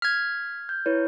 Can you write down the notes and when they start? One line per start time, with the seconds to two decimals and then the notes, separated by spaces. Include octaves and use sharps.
0.02 F6 G#6 B6
0.69 G6
0.86 E4 B4 C#5